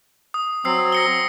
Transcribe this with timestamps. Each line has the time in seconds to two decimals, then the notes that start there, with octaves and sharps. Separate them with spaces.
0.34 D#6
0.65 F#3 C4 E6 C7
0.92 A#6 C#7 G7